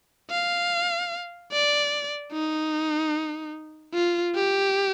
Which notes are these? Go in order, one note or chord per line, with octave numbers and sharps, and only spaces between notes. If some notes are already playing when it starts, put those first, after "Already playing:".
F5
D5
D#4
F4
G4